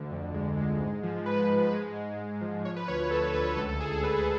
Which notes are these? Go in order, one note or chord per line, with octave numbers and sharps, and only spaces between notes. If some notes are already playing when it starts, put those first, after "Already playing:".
Already playing: D2 D3
F2
G#3
G#3
G#2
F3
F3 B4
G#2
G#3
G#3
G#3
F3
F3 C#5
B4
D2 C#5
B4
D2 A4
B4
D2 B4
C#5
C#2 A4
A4
C#2 G#4
A4
C#2 B4